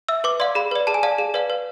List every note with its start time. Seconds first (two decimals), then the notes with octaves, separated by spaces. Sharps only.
0.09 E5 E6
0.24 B4 D6
0.40 D5 F5 C6
0.55 G#4 B5
0.71 B4 D5
0.87 G#4 A5
0.94 G#5
1.03 D5 F5 A5
1.18 G#4
1.34 B4 D5 F5
1.50 B4